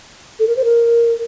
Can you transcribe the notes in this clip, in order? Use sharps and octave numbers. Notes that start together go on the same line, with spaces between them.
A4
A#4
C5
A#4